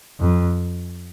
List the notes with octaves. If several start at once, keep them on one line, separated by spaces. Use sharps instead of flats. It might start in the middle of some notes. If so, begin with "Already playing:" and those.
F2